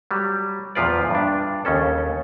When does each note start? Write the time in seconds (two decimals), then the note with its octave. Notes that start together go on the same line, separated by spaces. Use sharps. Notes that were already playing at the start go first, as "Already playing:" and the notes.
0.11 F#3 G3
0.75 E2 A#2 F3 F4 B4 D5
1.10 G2 D4
1.65 D#2 C#3 C#4 A4